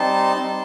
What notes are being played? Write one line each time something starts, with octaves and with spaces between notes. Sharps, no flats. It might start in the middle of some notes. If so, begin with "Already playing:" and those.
Already playing: G3 C4 D#4 A5 C6
G3 C4 D#4